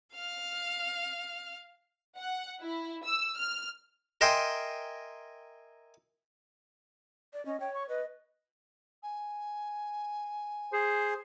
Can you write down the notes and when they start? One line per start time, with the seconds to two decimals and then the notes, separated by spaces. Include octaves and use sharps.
0.13 F5 F6
2.16 F#5
2.60 E4
3.05 E6
3.37 F6
4.21 A#4 D#5 E5 G5 G#5 C6
7.33 D5
7.46 C#4 D#5
7.60 C#5 G5
7.74 C#6
7.89 B4 D#5
9.02 G#5
10.73 G#4 C5